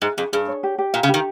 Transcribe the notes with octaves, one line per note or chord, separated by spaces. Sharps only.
G#2 G#4
F2 G#4
G2 G#4
C#5
G4
G4
A#2 F5
C#3
D#3 G4